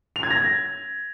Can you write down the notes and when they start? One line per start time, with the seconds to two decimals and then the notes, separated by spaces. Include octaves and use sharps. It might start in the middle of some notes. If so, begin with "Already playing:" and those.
0.16 F7
0.23 G#6
0.31 A#6